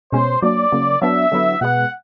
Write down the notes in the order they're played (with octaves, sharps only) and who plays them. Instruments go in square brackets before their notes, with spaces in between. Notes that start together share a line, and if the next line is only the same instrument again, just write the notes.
[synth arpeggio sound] B2 G#3 C#4 [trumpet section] C5
[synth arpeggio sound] F#3 A#3 D4 [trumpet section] D5
[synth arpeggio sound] C#3 F#3 A#3
[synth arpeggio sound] F#3 B3 D4 [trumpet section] E5
[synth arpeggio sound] D3 F#3 B3 E4
[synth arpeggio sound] B2 G#3 B3 [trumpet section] F#5